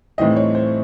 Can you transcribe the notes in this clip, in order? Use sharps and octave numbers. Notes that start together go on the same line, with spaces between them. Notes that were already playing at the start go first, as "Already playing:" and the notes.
A2 E3 G3 C4 D#4 D#5
C#5
C5